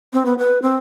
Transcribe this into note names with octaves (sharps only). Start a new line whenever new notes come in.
C4
B3
B4
C4